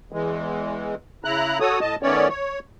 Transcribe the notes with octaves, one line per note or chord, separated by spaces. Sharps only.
E2 E3 G#3
C#3 E4 A#5 F#6
F#4 A4 C#5 D#6
A2 D#5 A5
D#3 A3 B3 C#4 C#5 D5
C#5